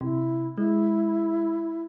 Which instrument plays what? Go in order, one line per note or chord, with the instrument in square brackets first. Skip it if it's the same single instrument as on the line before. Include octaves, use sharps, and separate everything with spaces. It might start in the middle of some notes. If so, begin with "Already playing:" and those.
[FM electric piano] C3 [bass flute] E4
[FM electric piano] G#3 [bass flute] E4